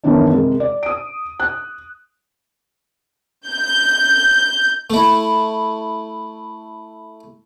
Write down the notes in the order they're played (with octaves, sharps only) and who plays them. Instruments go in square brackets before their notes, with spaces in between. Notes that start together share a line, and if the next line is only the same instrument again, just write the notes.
[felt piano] F#2 D#3 E3 B3 C#4 D4
C3 G#3 A#4
D5
D#6 D7
F#6
[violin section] G6
[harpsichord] A3 E4